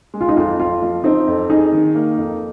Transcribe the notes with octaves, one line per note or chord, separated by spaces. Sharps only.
G#3
F4
D#4
F2 F4
F2 F4
F3
C4 D#4
F2
D#4 G#4
D#3
A#3
F2